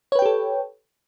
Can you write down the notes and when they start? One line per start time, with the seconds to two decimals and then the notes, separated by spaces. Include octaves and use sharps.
0.12 C#5
0.15 B4
0.19 G5
0.22 G4
0.26 A4